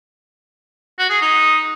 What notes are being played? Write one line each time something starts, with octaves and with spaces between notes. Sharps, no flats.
F#4
G#4
D#4